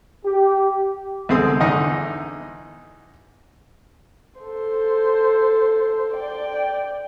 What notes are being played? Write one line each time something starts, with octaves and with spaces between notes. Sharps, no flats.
G4
C2 D3 G#3 C4 A4 D#6
E2 D3 D#4 D#5
A4 C5
D5 G5